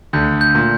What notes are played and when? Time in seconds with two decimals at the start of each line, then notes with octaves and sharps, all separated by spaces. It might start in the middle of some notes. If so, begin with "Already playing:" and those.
0.13 D2 D3 G6
0.41 G6
0.55 A#2